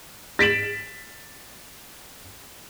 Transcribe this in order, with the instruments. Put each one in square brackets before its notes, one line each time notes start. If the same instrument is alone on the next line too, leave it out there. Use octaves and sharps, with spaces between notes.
[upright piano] A6 B6 D7 E7 F#7